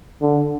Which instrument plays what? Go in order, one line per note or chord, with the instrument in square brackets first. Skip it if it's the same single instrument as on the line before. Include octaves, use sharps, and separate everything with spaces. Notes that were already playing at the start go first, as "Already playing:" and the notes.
[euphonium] D3